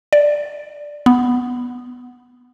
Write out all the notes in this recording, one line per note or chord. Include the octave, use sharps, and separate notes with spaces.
D5
B3